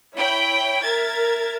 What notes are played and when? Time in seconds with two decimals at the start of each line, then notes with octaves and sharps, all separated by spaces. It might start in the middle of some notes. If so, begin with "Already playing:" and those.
0.16 E4 C#5 G5 B5
0.83 A#4 E5 G#6 A6